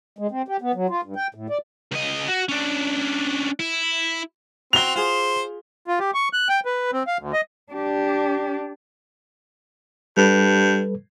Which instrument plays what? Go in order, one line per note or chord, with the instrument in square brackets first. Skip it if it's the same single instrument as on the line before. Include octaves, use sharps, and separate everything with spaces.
[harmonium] G#3
C4
G4
B3
F#3
F4
G2
G5
A2
D5
[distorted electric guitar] C#2 D#5
F#4
C#4 D4
E4
[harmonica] C4 [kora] F#4 [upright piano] F7 G7
[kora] F4 G#4 [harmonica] C5
[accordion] F4
G4
C#6
F#6
G5
B4
C4
F5
D2
D#5
[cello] D4 G4
[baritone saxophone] G2 [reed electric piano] G3 A4 B4